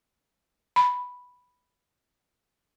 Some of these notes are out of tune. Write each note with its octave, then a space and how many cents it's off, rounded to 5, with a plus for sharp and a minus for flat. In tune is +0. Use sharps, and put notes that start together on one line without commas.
B5 +0